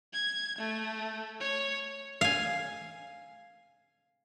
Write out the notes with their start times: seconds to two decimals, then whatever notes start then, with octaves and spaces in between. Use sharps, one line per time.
0.13 G#6
0.58 A3
1.40 C#5
2.21 F5 G#5